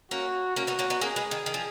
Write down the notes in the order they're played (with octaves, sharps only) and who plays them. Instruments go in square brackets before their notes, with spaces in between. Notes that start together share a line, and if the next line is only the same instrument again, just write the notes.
[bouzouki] A#3 C#4 [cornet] F#4
[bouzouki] A#3 C#4 [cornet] F#4
[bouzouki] B3 D#4
A#3 C#4
B3 D#4
[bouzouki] A#3 C#4 [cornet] G#4
[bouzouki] G#3 B3
D#3
D#3
F3